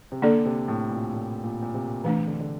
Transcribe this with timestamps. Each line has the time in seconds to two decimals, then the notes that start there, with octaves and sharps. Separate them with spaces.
0.12 C3
0.22 D3 A#3 D4 A4 D5
0.46 C3
0.68 A2
0.91 A#2
1.14 A2
1.44 A#2
1.63 A#2
1.74 C3
2.04 C3 E3 A3 D4
2.27 D3
2.40 D3